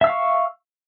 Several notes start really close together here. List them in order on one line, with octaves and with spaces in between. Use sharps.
E5 E6 F5 C#6